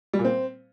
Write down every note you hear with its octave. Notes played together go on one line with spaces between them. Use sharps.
G3
A#2
C4